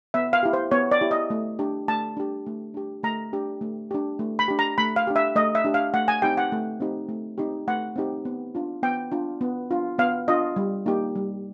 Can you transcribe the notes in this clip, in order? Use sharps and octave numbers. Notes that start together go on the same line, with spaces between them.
B3 E5
F5
E4 G4
C5
B3 C#5
D5
E4 G4
D#5
A3
D4 G4
A3 A5
D4 G4
A3
D4 G4
A3 A#5
D4 G4
A3
D4 G4
A3
B5
D4 G4
A#5
A3 B5
F5
D4 G4
E5
A3 D#5
E5
D4 G4
F5
A3 F#5
G#5
C4 D#4 G4 G5
F#5
A3
C4 D#4 G4
A3
C4 D#4 G4
A3 F#5
C4 D#4 G4
B3
D4 F4
B3 G5
D4 F4
B3
D4 F4
B3 F5
D4 F4 D#5
G3
A#3 D#4 G4
G3